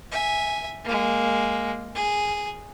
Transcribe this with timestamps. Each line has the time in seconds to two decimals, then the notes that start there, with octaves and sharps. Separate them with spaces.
0.11 E5 G#5
0.84 G#3 A#3
1.95 G#4